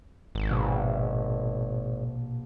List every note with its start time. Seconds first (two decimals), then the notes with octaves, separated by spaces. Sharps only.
0.35 G#1
0.49 A#1 B2